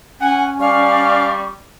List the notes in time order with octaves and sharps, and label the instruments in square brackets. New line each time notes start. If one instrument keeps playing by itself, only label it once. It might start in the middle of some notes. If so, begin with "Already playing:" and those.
[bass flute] C#4 [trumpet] F#5 [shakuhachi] G#5
[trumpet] G3 [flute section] D5 F5 F6 [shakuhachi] C#6